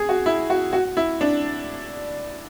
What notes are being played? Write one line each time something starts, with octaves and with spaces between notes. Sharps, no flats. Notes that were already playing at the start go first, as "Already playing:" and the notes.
Already playing: G#4
F#4
E4
F#4
F#4
E4
D4